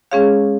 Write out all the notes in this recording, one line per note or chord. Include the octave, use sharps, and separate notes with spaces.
G#3 C#4 G#4 C#5 F5